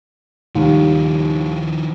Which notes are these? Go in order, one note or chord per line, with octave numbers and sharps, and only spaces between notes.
D#2 D#3 F3 G3